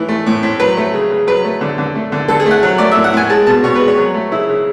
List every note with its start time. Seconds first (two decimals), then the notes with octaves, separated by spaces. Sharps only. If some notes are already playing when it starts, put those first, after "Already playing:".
Already playing: A2 E3
0.08 A3
0.26 A2
0.43 A2
0.60 F#3 B4
0.77 A3
0.94 C#3
1.11 C#3
1.27 F#3 B4
1.44 A3
1.61 D3
1.78 D3
1.95 A3
2.12 D3
2.28 D3 A4
2.40 G#4
2.46 A3
2.51 F#5
2.63 F#3
2.78 A3 D5
2.91 A2 E5
3.04 F#5
3.13 A2 G#5
3.29 G#3 A5
3.47 B2 A5
3.64 B2 C#5
3.76 B4
3.81 G#3
3.87 C#5
3.97 F#3
4.14 A3
4.31 C#3 E4
4.49 C#3